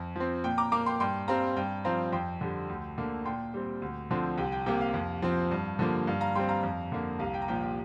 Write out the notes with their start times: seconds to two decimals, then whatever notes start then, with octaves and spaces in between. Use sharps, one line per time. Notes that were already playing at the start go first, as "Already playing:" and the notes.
Already playing: F2
0.16 F3 C4
0.44 A#2 G5
0.58 A#5 D6
0.72 A#3 A#5 D6
0.86 G5 C6
1.00 G2 G5 C6
1.28 G3 C4 F5 A#5
1.56 G2 G5
1.85 F3 C4 F5 A#5
2.12 F2 G5 C6
2.41 D3 G3
2.69 D2
2.98 D3 A#3
3.25 A#2 G5 C6
3.54 G3 C4
3.82 D2
4.11 D3 F3 C4
4.38 C2 G5
4.52 G5
4.66 C3 A#3 G5
4.81 F5
4.94 F2
5.22 F3 C4
5.51 G2
5.79 D3 F3 A#3
6.07 G2 F5
6.21 F5 A#5
6.35 G3 C4 G5 C6
6.49 F5 A#5
6.63 F2
6.92 D3 A#3
7.19 C2 F5 A#5
7.34 G5
7.42 A#5
7.48 A#2 F3 G5
7.62 G5